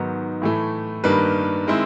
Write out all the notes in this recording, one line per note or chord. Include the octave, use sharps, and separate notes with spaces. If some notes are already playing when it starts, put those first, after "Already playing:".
Already playing: G#2 D#3 F#3 B3
A2 E3 A3
G2 D#3 G3 A#3 B4
D#3 G#3 C4 E4